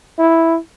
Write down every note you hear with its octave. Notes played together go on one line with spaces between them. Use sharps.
E4